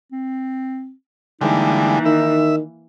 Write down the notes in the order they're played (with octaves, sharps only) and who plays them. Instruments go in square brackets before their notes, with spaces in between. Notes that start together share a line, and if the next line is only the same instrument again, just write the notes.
[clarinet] C4
[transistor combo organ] D3 G3 G#3 [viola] E3 A#3 [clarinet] D#4
[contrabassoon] D#3 [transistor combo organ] E5